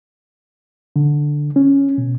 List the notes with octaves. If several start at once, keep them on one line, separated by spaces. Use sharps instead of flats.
D3
C#4
B2